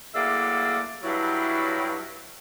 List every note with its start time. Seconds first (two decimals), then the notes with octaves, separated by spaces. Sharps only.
0.15 A2 F#3 A#3 G#4 D5 E5
1.03 G2 F#3 E4